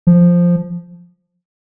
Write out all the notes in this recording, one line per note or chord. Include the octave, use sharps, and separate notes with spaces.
F3